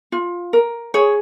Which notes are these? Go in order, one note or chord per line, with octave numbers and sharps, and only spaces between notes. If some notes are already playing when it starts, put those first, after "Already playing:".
F4
A#4
G#4 C#5